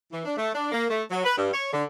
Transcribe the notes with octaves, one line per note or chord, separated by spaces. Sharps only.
E3
D4
A3
D4
A#3
A3
F#3
B4
G2
C#5
D3